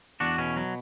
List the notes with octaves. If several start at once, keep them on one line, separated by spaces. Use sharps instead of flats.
E2 D4 F#4
B2 C#4
F#3